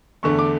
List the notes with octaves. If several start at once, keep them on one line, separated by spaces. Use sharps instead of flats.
E2 D3 A3 C#6
D6